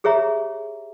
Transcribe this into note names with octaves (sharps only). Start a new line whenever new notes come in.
G4 G#4 C#5 E5 A#5